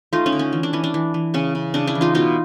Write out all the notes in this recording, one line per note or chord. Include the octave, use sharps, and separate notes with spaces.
A3 D#4 F4
C#4 D#4
D3
C#4
E3
D4
E3 C#4
D4
E3
E3
C#3 C#4
C#3
C#3 D4
D4 E4
E3
D#4 F4
B2 D#4 F4